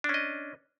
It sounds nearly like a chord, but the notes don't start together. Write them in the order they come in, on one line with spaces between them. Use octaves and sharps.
D4 C#4 D#5